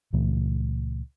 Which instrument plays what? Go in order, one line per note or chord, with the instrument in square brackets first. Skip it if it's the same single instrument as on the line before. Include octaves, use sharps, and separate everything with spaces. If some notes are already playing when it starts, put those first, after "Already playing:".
[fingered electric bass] C#2 A#2 E3 A3